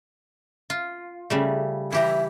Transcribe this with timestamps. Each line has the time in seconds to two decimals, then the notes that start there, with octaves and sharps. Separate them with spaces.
0.70 F4
1.30 C#3 G3 A3
1.92 E3 G4 E5 A#5